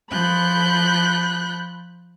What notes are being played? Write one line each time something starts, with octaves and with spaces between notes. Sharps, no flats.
F3 B5 F#6 G6